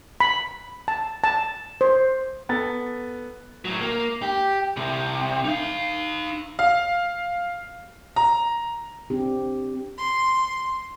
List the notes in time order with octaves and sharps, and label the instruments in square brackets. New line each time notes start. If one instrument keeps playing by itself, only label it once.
[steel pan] B5
A5
A5
C5
[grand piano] B3 A4 A6
[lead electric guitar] A2 F#3
A#3
G4
C2 C3
D#4 F5
[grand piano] F5
A#5
[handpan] C4 D4 G4
[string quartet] C6